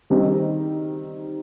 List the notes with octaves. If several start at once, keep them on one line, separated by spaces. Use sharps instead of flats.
D#3 G3 C4 D#4